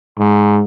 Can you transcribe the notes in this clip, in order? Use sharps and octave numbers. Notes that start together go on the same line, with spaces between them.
G#2